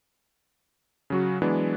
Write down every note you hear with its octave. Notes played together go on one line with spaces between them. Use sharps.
C#3 F#3 F#4
E3 F#3 G#3 B3 D4